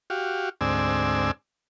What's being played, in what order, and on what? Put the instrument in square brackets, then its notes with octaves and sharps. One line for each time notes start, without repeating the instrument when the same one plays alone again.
[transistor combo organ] F#4 G4 F5
D2 G#2 C4 D5 G#5 E6